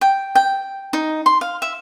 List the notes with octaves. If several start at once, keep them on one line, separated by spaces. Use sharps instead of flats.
G5
G5
D#4
C6
F5
E5